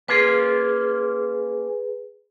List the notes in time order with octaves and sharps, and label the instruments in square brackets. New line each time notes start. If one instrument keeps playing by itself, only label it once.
[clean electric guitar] A#3 C#4 F4 [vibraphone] G#4 B4